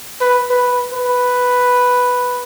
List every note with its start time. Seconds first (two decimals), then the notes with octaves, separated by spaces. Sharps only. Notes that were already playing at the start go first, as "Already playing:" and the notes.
0.21 B4
0.50 B4
0.94 B4